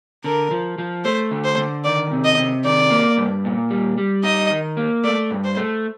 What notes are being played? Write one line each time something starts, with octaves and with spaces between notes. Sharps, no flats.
D3 A#4
F3
F3
A3 C5
D3
C5
D3
D#3 D5
C3
D#5
C3
D#3 D5
A#3
G2
A#2
G3
G3
D#4 D#5
D#3
A#3
A3 D5
G2
C5
A3